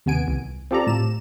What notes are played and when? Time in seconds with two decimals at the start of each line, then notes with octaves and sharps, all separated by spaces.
0.06 D#2 C3 B3 G#5 D7
0.28 C2
0.71 C4 F4 G4 A4 D5 A#5
0.87 A2 E7